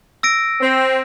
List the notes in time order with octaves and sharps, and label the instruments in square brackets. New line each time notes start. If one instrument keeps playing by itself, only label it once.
[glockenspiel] E6 A#6 D7
[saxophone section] C4